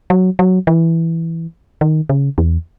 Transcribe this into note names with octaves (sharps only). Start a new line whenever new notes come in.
F#3
F#3
E3
D#3
C#3
E2